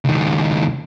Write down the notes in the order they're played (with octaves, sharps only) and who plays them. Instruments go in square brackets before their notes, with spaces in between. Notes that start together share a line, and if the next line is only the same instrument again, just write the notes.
[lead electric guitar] C#2 D#3